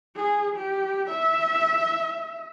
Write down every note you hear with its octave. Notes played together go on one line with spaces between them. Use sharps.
G#4
G4
E5